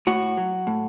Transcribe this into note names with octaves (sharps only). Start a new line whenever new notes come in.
A2 F#4
F#3
A2